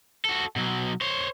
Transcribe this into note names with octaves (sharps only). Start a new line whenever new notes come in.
F#4 A4
B2 F#3
C5 C#5